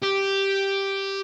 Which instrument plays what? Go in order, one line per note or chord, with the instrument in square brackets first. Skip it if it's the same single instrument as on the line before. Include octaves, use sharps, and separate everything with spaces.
[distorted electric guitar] G4